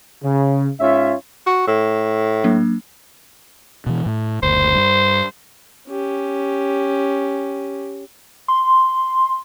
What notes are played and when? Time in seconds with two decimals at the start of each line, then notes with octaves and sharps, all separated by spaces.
0.24 C#3
0.80 G#2 C#4 F4 C#5 E5
1.46 F#4
1.67 A2
2.44 F#3 A#3 D4
3.86 B2 E3
4.06 A2
4.43 F#1 D2 C5
4.76 G2
5.88 C#4 G4
8.48 C6